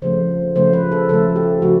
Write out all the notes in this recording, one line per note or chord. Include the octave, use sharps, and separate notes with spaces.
C#3 F3 A3 C5
C#3 F3 A3 C5
B4
A4
C#3 F3 A3 A4
G4
C#3 F3 A3 F#4